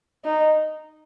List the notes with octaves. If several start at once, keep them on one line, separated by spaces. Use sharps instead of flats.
D#4